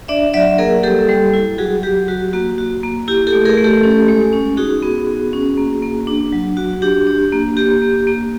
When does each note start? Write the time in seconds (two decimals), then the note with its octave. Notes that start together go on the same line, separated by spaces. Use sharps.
0.08 D4 D5 E5
0.34 F#3 D5 E5
0.58 A#3 G#4 A#4
0.83 G3 G4 A4
1.09 G3
1.34 E4
1.58 F#3 F#4 G#4
1.83 F#3 G4
2.08 F#3 F#4
2.33 A#3 F#4
2.58 F#4
2.83 A#3
3.08 E4 G4
3.27 G4 A4
3.33 A3
3.45 G#4 A#4
3.57 A3
3.64 G4 A4
3.83 C#4
4.08 G#3
4.33 C#4
4.57 D#4 F#4 G#4
4.83 B3
5.07 B3
5.33 C#4
5.58 A#3
5.82 A#3
6.07 D4
6.32 F#3
6.57 F#4
6.82 D4 G4
7.07 D4
7.32 A#3
7.57 A#3 G4
7.82 A#3
8.07 A#3